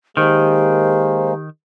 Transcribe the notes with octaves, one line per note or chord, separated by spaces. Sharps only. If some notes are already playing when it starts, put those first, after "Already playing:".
D#3 G#3 A#3 G4 C5